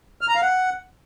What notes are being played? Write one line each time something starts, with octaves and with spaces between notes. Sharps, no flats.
F6
A#5
F5
F#5